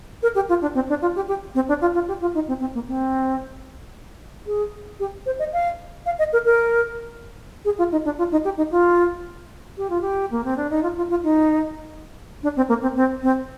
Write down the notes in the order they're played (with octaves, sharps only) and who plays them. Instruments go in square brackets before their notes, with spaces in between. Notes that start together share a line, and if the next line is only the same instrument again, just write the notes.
[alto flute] A#4
G4
F4
D4
C4
D4
F4
G4
G4
C4
D4
F4
F4
G4
F4
D#4
C4
C4
A#3
C4
G#4
G4
C5
D#5
F5
F5
D#5
A#4
A#4
G#4
F4
D#4
D4
F4
D#4
G4
D#4
F4
G4
F4
G4
A#3
C4
D4
D#4
F4
F4
F4
D#4
D4
C4
A#3
C4
C4
C4